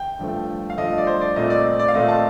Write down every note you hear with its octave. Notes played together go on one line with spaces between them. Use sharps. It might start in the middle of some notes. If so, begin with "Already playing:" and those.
Already playing: G5
G2 F3 A3
F5
G2 F3 A3 D#5
D5
C5
D5
A#2 A3 C4 D#5
D5
D5
F5
A#2 A3 C4 D#5
A5